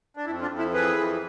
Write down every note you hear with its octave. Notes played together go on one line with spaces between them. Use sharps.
D4
F2 E4
D4 F4
F2
E4
E3 G#4 B4
F2